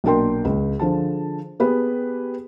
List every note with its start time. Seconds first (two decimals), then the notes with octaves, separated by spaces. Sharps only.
0.04 B1 A#2 D4 A#4 G5 C6
0.45 C#2
0.79 D3 F3 G#4 A5
1.60 B3 G4 G#4 B4